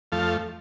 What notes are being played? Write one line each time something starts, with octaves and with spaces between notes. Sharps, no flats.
F2 F3 A3 F5 A5